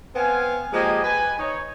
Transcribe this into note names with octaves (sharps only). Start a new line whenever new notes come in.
B3 C4 F5 G#5
F3 G#3 A#3 G4 D#5 G#5
B4 G#5
D#4 C#5